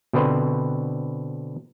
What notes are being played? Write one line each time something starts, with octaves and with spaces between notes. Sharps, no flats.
B2 D3 C4 B4 C5